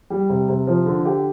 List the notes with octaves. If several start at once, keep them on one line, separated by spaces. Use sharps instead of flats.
G3
C3
C3
F3
D3
G4